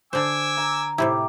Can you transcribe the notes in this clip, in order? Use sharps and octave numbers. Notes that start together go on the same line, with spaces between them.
D3 C5 G#5 D6 E6
A#5
A2 C3 E4 G4